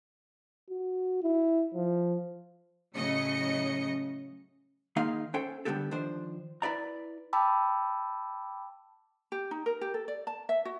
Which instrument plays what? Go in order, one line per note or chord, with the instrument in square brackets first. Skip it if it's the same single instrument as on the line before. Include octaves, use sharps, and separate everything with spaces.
[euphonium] F#4
E4
F3
[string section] A2 C#3 F#3 D#5 C#7
[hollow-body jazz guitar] D#3 A#3 D#4 G#4 F5 C6
C#4 A4 C5 G5
D3 F#3 G3 B3 G4 A4
D#3 F3 D4 C5
E4 B4 D5 A#5
[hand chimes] G5 A5 B5 D6 E6
[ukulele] G4
D#4
A#4
G4
A4
D5
A5
E5
F#4